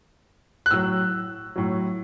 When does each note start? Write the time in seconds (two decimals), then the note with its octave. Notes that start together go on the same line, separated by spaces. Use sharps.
0.66 F#6
0.71 A2 F#3 E6
1.56 A2 F#3